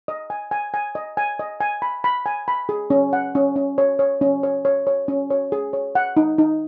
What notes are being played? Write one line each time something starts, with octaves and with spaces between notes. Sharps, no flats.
D#5
G#5
G#5
G#5
D#5
G#5
D#5
G#5
B5
B5
G#5
B5
G#4
C#4
F#5
C#4
C#4
C#5
C#5
C#4
C#5
C#5
C#5
C#4
C#5
G#4
C#5
F#5
D#4
D#4